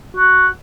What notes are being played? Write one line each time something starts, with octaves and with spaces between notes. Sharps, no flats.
F#4